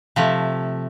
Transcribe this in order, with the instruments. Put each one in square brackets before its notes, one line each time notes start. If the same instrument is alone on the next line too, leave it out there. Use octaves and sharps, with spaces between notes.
[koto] C3 F3 A3